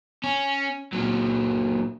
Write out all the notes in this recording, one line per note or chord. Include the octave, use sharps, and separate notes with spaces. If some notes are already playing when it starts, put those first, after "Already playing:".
C#4
A#2 F#3